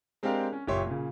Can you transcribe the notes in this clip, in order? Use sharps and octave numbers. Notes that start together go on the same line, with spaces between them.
G#3 C4 D4 G4 A#4 F5
C#4
F#1 A#2 G4 C#5 E5 C6
A#2 C#3